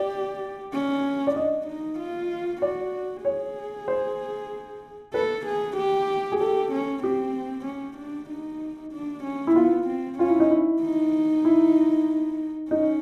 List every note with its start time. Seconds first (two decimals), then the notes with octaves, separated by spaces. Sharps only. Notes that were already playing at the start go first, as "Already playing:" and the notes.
Already playing: G4 D5
0.73 C#4
1.27 D5
1.35 D4 D#5
1.67 D#4
1.99 F4
2.62 F#4 D5
3.25 G#4 C#5
3.88 C5
5.14 A4 B4
5.46 G#4
5.77 G4
6.32 G#4
6.40 G4 A4
6.72 C#4
7.04 C4 G4
7.66 C#4
7.98 D4
8.30 D#4
8.93 D4
9.24 C#4
9.47 E4
9.56 B3 F4
9.87 C4
10.19 C#4 F4
10.30 E4
10.40 D#4
10.51 E4
10.82 D#4
11.45 E4
12.71 C#4 D#4